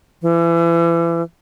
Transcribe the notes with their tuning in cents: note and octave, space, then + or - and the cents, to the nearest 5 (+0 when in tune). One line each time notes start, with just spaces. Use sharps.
E3 +35